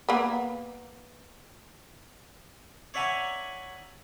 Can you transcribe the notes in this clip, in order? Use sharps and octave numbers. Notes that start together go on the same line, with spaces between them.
A#3 B3
C#5 D5 E5 F#5 G#5 A#5